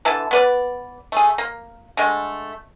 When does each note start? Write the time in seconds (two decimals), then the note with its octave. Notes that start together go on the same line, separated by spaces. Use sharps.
0.05 D3 E3 E4 A5
0.31 B3 B4 D5
1.12 A3 G#4
1.38 A#3
1.97 D3 G#3 A3